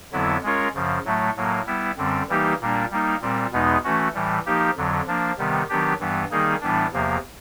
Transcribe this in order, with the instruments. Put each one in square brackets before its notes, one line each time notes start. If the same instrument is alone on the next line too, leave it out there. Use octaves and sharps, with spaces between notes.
[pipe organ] F2 D3 F#3 B3 E4
G#3 C#4 F4 A#4 C#5
F#2 C#3 F3
A2 F#3 A3
A2 F#3 A#3
G3 B3 E4
F#2 D3 G3 C4
E3 G3 A#3 D#4 G4
A#2 G3 A#3 D4
G3 A#3 D#4
A#2 G3 C4
E2 B2 G#3 B3 D#4
E3 A3 C#4 F#4
A2 E3 G3
F3 A#3 D#4 G4
F2 D3 F#3
F3 A#3 D4
C3 D#3 G3 B3
D#3 F#3 B3 D4 G4
G2 E3 G3 B3
D#3 G3 A#3 D#4 G#4
A2 E3 G3 B3 D4
E2 C3 F3 A#3